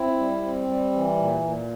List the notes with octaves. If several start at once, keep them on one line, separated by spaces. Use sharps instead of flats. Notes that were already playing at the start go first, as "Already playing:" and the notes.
Already playing: C4 E4
G3
C4
G3
E3
A#2
A#2